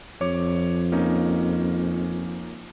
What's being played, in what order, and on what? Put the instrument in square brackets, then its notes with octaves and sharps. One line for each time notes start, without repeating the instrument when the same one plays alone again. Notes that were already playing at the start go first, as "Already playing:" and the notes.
[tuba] F2 [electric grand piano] C#5 D6
[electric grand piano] A#3 C#4 D#4